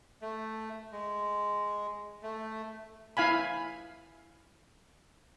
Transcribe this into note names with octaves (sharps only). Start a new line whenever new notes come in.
A3
G#3
A3
E4 F5 G#5 B5